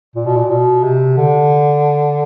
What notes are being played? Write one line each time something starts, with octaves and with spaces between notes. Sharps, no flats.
A#2
B2
A#2
B2
C3
D3